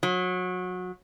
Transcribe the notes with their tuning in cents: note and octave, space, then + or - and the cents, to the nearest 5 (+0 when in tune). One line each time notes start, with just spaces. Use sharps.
F#3 -25